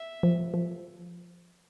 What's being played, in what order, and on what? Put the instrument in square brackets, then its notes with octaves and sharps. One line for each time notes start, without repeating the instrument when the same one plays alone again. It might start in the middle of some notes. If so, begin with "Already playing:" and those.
Already playing: [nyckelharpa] E5
[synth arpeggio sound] F3
F3